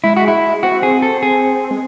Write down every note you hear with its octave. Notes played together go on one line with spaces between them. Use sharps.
G#3 E4
F#4
E4
C4 F#4
G#4
A4
G#4
G#3